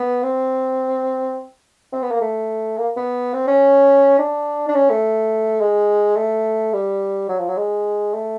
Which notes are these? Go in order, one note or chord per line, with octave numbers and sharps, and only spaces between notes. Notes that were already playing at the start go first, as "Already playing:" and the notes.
Already playing: B3
C4
C4
B3
A#3
A3
A#3
B3
C4
C#4
D4
D4
C#4
A3
G#3
A3
G3
F#3
F3
F#3
G#3
A3